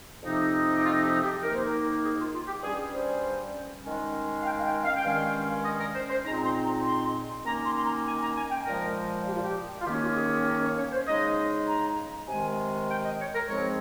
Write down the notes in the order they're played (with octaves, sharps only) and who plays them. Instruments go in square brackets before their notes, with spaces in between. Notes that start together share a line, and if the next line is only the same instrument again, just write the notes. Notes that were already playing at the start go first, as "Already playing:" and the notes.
[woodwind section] F2 C3 F3 C4 D#4
G4
F4
G4
G4
D#3 A#3 D#4 A#4
C5
A#4
G#4
F4
F4
G4
G2 G3 C#4 G#4
C5
D#3 G#3 C#4
F5
G5
F5
G5
F5
G5
G2 D#3 G#3 C#4 F5
D#5
A#4
C5
C5
A#2 G#3 C4 D#4 A#5
A#5
C6
A#5
C6
D#3 A#3 C#4 A#5
C6
C6
A#5
G#5
A#5
G#5
G5
A#2 F3 G#3 A#4
G4
F4
G4
F4
D#3 A#3 C#4 G4
G4
F4
G#4
G#4
A#4
C#5
C#5
C5
C#3 G#3 D#4 D#5
A#5
C3 D#3 G#3 G#5
G5
D#5
C#5
A#4
G#2 F3 G#3 C4 C#5